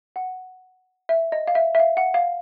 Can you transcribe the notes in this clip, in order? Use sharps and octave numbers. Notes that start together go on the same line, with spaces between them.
F#5
E5
D#5
F5
E5
E5
F5
F#5
F5